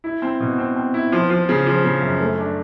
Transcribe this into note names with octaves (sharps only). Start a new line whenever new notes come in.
E4
C4
B2
C4
C4
E4
F3
F3
C#3
F3
C#3
F#2
A3
D4